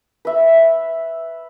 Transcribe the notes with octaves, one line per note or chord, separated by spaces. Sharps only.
B4 E5